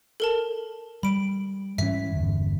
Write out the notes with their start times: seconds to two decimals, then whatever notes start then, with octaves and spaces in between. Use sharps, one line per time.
0.20 A4 A#4 A5
1.03 G3 B5 D7
1.78 G#2 E3 C#4 E5 B6
2.14 G1 E2